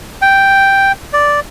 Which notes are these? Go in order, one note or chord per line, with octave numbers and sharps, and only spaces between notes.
G5
D5